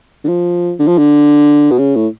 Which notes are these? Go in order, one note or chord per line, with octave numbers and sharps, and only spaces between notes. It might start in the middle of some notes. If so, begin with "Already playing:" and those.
D3
F3
D3
F3
D3
B2
C#3
A2